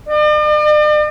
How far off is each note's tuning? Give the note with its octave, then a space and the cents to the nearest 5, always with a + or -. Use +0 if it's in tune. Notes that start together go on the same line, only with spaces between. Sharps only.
D5 +45